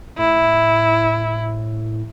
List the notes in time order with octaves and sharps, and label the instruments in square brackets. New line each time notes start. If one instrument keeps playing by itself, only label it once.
[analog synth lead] A2 [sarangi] E4